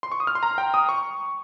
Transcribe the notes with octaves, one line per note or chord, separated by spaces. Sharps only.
C6
C#6
D#6
F6
C6
A#5
G5
D#6
C#6